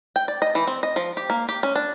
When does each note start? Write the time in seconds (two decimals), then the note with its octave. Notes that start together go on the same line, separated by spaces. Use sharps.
0.16 G5
0.28 D5
0.42 D#5
0.55 E3
0.67 C4
0.83 D#5
0.96 F3
1.17 G4
1.30 A#3
1.49 G4
1.63 C#4
1.76 D4